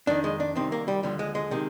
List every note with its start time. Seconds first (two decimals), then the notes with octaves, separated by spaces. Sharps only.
0.07 F2 D#3 D4
0.24 G#3
0.40 D4
0.56 C2 C3 D#3 C4
0.72 A#3
0.88 G3
1.03 D#2 D3 F3 G3
1.19 G#3
1.35 G#3
1.51 C3 D#3